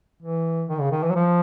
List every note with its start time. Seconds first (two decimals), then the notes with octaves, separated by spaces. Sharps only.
0.23 E3
0.69 D#3
0.80 C#3
0.92 D#3
1.03 E3
1.10 F#3
1.15 F3